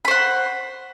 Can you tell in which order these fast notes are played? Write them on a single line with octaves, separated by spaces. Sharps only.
B5 C5 F#5